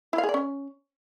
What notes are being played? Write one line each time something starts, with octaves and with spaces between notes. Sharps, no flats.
E4
F5
G#4
D5
C#4